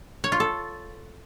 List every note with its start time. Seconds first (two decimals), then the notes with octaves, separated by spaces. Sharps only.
0.24 C#5
0.32 F4
0.40 A4